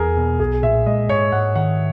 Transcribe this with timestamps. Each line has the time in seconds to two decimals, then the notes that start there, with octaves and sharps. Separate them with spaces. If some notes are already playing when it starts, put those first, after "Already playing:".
Already playing: E2 G#4 A#4
0.17 B2
0.39 B1 G#4
0.63 A#2 E5
0.86 G#3 D#5
1.09 G#2 C#5
1.32 G#2 F#5
1.55 D#3 F#5